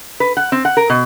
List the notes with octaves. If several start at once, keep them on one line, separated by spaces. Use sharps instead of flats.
B4
F#5
C4
F#5
A#4
B2